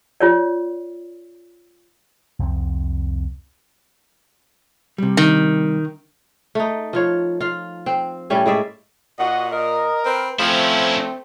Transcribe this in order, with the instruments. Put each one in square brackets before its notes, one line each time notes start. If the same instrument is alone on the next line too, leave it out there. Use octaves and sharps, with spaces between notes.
[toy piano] F4 C#5 D5
[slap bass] C2 F2 F#3 C4
[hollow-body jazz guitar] C3 G3
[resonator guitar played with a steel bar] D#3
[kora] A3 D#4
F3 F4 C#5
F4 F5
C4
A2 G3 C#4 E4
A2 G#3 D5 E5
[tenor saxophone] A#2 [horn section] F#4 D#5 [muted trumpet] F#5
[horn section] A#4 [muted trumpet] D#5
[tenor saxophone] C4 [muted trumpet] B4
[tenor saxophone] F3 [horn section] A3 [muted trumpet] C4 [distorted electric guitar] C#4 E4